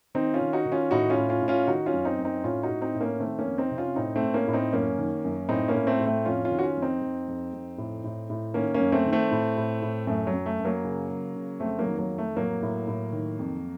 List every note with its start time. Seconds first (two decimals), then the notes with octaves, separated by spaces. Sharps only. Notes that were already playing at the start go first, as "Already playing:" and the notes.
0.15 D#3 C4 D#4
0.34 C#4 F4
0.41 D#3
0.53 D#4 F#4
0.66 D#3
0.72 C#4 F4
0.91 A2 D#4 F#4
1.10 C#4 F4
1.17 A2
1.29 C#4 F4
1.42 A2
1.48 C#4 F4
1.68 D#3 D#4 F#4
1.86 C#4 F4
1.93 F#2
2.05 C4 D#4
2.19 F#2
2.25 C4 D#4
2.44 A2 C#4 F4
2.63 D#4 F#4
2.69 A2
2.81 C4 D#4
2.95 A2
3.01 A#3 C#4
3.20 D#3 A3 C4
3.39 A#3 C#4
3.45 F2
3.58 C4 D#4
3.71 C3
3.78 C#4 F4
3.96 A2 C4 D#4
4.16 A3 C4
4.22 A2
4.34 A#3 C#4
4.48 A2
4.53 C4 D#4
4.73 F#2 A#3 C#4
4.98 D#3
5.24 F#2
5.49 A2 C4 D#4
5.68 A#3 C#4
5.75 A2
5.87 A3 C4
6.00 A2
6.06 A3 C4
6.25 F2 C#4 F4
6.45 C#4 F4
6.52 D#3
6.59 F#4
6.63 C#4 F4
6.77 F2
6.82 C4 D#4
7.02 F2
7.28 F2
7.53 F2
7.78 A2
8.04 A2
8.30 A2
8.54 D#3 A#3 C#4
8.74 A#3 C#4
8.80 F#2
8.92 A3 C4
9.05 D#3
9.12 A3 C4
9.31 A2
9.57 A2
9.82 A2
10.07 F#2 A3
10.27 F#3
10.33 F#2
10.46 A3
10.59 F#2
10.65 F#3 A#3
10.84 C#3
11.09 C#3
11.35 C#3
11.60 F2 A3 C4
11.79 F#3 A#3
11.85 D#3
11.99 F#3 A#3
12.11 F2
12.18 A3
12.37 A2 F#3 A#3
12.62 A2
12.88 A2
13.12 D#3
13.39 F2